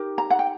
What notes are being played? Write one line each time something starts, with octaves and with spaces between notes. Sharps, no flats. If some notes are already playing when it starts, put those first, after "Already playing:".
Already playing: D#4 G4 A#4
A#5
F#5
G5